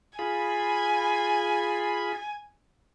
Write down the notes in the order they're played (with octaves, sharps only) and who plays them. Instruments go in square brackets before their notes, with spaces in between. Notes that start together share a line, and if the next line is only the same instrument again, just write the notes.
[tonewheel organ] F4 G#4 B5 [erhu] G#5